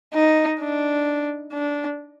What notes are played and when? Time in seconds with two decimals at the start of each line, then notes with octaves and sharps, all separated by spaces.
0.14 D#4
0.60 D4
1.53 D4